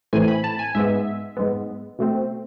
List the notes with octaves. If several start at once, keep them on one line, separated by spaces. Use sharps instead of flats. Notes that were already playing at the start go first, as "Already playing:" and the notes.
A2 E3 A3 C4 G#5
B5
A5
G#5
G#2 G#3 B3 E5
G#2 G#3 B3
B2 A3 C4